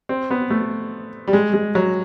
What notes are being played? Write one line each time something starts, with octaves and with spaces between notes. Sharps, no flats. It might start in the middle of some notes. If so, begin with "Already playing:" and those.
C4
B3
A3
G3
G#3
G#3
F#3